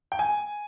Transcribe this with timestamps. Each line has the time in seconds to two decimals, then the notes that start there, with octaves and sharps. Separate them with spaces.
0.12 G5
0.19 G#5